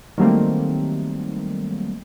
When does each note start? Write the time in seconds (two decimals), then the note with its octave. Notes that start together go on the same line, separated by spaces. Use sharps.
0.18 D#3 F#3 G3 A3 A#3 C4